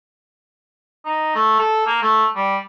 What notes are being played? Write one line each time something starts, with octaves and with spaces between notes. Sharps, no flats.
D#4
A3
A4
A#3
A3
G3